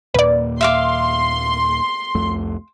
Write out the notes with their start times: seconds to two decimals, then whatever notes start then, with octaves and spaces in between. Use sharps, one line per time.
0.14 D#2 A#2 A#3 B4 D5
0.61 E5 F5 C6 D6
2.15 C2 F2 A3